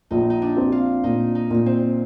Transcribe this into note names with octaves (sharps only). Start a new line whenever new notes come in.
A#1 D#4
D#4
D4
C4
F4
A#2 D#4
D#4
A#2
C4